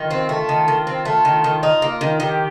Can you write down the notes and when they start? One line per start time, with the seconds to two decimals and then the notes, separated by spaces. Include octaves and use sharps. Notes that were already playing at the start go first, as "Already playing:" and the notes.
Already playing: D#3 F4
0.11 C4
0.29 A3
0.49 D#3
0.68 D#3
0.87 C4
1.05 A3
1.25 D#3
1.44 D#3
1.63 D#4
1.82 A#3
2.01 D#3
2.20 D#3 G4